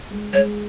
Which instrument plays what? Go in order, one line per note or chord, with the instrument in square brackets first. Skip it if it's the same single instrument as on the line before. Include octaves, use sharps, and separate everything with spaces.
[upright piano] G#3
[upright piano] G#3 [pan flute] C#5